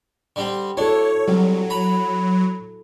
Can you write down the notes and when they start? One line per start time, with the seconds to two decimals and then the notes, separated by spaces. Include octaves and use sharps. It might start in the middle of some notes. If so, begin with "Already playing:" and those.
0.36 D3 G3 C4
0.77 D4 E4 F#4 A4 C#5
1.28 C2 F#3
1.70 A#5 B5